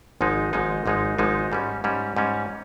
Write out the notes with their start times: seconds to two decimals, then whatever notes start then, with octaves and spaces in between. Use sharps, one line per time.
0.21 G#1 G#2 F3 G#3 D#4
0.53 G#1 G#2 F3 G#3 D#4
0.86 G#1 G#2 F3 G#3 D#4
1.18 G#1 G#2 F3 G#3 D#4
1.52 G#2 G3 C#4
1.84 G#2 G3 C#4
2.17 G#2 G3 C#4